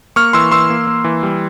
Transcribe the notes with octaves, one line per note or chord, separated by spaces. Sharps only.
A#3 C#6 F6
E3 C6 E6
E3 C6 E6
A#3
A#3
E3
G3